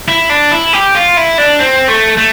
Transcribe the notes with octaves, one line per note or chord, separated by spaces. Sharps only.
E4
D4
E4
G4
F4
E4
D4
C4
A3
A3